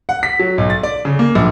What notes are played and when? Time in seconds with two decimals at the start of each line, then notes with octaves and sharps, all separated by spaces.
0.09 F#5
0.23 B6
0.39 F#3
0.58 B1
0.70 A6
0.83 D5
1.05 C#3
1.19 A#3
1.35 A#1